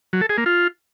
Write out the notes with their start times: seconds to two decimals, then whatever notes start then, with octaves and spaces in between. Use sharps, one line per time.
0.13 F#3
0.21 A4
0.29 G#4
0.38 A#3
0.46 F4